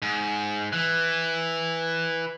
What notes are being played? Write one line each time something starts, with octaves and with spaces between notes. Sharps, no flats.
G#2
E3